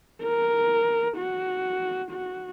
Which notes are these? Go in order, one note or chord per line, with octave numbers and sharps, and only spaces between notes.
A#4
F#4
F#4